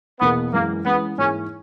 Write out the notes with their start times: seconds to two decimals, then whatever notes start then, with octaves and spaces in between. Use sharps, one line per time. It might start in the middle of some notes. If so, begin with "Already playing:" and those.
0.21 E2 B2 A#3 B3
0.53 F#2 E3 G#3 A#3
0.85 E3 G#3 B3 C#4
1.18 G#2 E3 A#3 C#4 E4 G#4